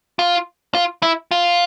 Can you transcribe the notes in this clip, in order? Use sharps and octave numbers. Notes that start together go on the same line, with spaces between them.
F4
F4
E4
F4